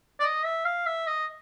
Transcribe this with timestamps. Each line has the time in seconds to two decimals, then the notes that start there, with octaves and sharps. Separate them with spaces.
0.20 D5
0.23 D#5
0.45 E5
0.65 F5
0.86 E5
1.07 D#5